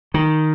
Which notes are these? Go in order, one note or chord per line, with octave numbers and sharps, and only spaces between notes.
D#3